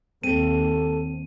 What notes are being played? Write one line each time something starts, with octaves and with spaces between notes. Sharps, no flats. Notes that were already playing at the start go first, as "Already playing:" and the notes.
D#2 C4 A4 D#7